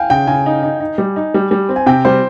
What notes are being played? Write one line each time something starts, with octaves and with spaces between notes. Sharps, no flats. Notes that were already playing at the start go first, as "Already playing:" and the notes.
Already playing: F5 G5 G#5
C#3 G5
C#3 G#5
D#4
D#4
D#4
G3
D#4
G3
G3
C4
G#5
C3 G5
G3 C5